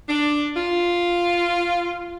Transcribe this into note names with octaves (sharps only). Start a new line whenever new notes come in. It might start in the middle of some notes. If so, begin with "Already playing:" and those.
D4
F4